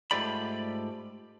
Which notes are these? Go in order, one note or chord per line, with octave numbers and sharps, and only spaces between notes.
G#2 A3 F4 G4 D5 B5